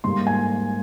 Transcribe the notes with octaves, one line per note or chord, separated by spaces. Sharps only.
G#2 G3 A#3 C6
G#5